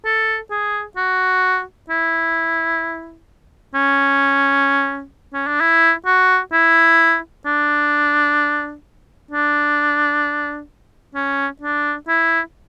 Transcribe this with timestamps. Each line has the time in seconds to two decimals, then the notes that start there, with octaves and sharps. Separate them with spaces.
0.05 A4
0.51 G#4
0.97 F#4
1.90 E4
3.75 C#4
5.33 C#4
5.47 D4
5.61 E4
6.06 F#4
6.53 E4
7.46 D4
9.31 D4
11.15 C#4
11.62 D4
12.08 E4